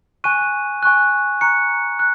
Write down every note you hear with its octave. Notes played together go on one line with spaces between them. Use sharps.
G#5 C#6 F#6 D#7
G#5 C#6 F#6
A#5 C#6 F#6 C#7
F#6